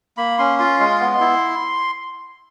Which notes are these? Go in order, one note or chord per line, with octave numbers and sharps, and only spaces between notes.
A#3 B5
C#4 C6
F4 C6
G#3 C6
B3
E4